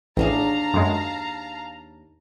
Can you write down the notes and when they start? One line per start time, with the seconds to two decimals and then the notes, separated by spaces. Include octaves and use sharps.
0.17 A1 D#2 D4 G#4 F5 A5 A#5
0.74 F#2 G#3